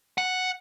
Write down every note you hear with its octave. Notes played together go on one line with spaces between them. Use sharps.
F#5